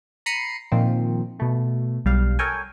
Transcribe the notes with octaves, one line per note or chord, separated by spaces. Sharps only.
A#5 B5 C7 C#7 D#7
A#2 D#3 F3 C4
B2 A3
B1 G3 F5
A4 A#4 C#5 G5 G#5